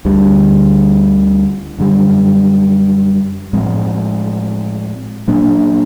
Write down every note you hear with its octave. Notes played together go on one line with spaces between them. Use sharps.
D2 D3 G3
F#2 D3 G3
A2 F3 G#3 C4
A#2 F#3 A#3 D4